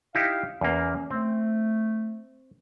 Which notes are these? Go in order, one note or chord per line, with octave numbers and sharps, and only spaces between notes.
D#4 E4 G4 F5
E2 A#3 C#4
A3 C4